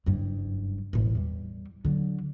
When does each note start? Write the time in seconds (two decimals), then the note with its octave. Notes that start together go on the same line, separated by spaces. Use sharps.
0.06 F#1 G2
0.93 E1 A1
1.15 E2 G3
1.85 D3 F#3